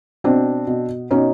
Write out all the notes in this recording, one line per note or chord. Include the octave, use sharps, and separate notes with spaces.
B2 C4 D4
B2
B2 C#4 D#4